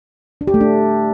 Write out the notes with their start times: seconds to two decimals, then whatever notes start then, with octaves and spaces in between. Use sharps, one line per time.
0.41 D4
0.47 G4
0.54 A3
0.60 D4